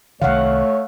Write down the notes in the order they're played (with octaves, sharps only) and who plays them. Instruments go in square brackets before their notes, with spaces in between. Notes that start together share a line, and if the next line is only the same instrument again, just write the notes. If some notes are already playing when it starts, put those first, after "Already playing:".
[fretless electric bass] C2 C3 D#3 [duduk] A3 [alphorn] C#5 [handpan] F5 F#5